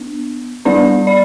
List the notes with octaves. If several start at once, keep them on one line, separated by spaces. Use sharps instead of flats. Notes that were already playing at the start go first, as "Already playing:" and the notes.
Already playing: B3 D4
G3 B3 D4 D5
D5